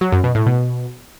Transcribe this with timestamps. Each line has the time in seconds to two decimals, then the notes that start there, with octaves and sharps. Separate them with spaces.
0.01 F#3
0.12 F#2
0.24 B2
0.35 A2
0.46 B2